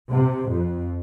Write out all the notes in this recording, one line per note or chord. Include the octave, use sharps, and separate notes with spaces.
C3
F2